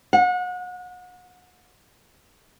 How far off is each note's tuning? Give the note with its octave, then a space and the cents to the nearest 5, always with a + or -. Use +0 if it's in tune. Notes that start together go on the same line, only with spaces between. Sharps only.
F#5 -35